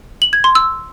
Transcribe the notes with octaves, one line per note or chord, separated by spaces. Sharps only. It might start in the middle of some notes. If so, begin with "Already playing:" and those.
F#7
G#6
C6
E6